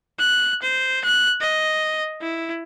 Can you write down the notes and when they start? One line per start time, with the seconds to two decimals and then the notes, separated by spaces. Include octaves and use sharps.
0.19 F#6
0.62 C5
1.05 F#6
1.41 D#5
2.21 E4